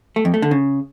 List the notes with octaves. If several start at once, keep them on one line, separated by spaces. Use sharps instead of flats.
A3
F2
A3
D3
C#3